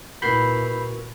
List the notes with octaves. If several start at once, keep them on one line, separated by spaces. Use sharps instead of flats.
A#2 E4 F#4 A#4 B4 B5 G6 C7